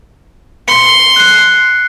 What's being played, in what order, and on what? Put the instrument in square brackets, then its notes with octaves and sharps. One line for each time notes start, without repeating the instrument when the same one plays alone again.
[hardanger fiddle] C6 [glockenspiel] C#7
[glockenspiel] F#6 C7